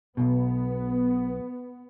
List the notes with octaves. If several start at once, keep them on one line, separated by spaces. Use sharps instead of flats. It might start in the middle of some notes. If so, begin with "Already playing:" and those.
B1 B2 B3